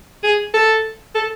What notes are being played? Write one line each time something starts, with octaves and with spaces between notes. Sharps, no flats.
G#4
A4
A4